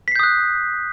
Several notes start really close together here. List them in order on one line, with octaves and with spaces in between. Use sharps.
B6 C7 G6 D#6 F#6